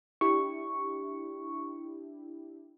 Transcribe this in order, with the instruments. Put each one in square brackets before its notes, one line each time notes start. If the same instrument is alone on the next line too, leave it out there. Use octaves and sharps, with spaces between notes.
[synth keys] D4 E4 G4 [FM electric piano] C#6